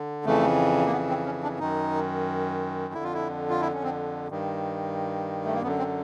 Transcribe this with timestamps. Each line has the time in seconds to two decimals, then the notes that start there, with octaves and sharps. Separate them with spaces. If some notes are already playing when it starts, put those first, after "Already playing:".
Already playing: D3
0.25 F2 C#3 E3 A3
0.86 A#3
0.92 B3
1.10 C4
1.25 C#4
1.43 D4
1.59 F#2 D#3 D#4
2.94 F2 D3 E4
3.04 F4
3.14 E4
3.50 F4
3.61 E4
3.74 C#4
3.83 C4
4.28 G2 D#3
5.45 A3
5.54 A#3
5.62 F#2 D3 B3
5.78 C4